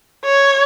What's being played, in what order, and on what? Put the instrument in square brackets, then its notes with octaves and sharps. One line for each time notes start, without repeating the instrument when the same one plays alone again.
[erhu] C#5